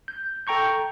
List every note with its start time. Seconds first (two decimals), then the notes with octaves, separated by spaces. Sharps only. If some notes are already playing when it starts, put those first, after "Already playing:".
0.08 G6
0.47 A4 G5 A#5 C#6 G6